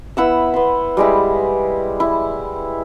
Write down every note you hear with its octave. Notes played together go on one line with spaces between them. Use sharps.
B3 E4 F#5 E6
B3 C6
G3 G#3 E4
E4